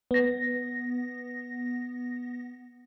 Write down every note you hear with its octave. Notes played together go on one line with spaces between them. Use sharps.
B3 A#6